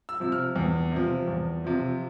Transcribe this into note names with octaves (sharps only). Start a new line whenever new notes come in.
E6
C3 F3
F6
E2
C3 F3
E2
C3 F3